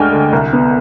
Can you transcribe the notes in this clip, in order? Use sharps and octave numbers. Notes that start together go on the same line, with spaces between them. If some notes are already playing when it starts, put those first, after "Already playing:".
Already playing: D2 G#3 D4 G5 G#5 F6
D3
C2
B3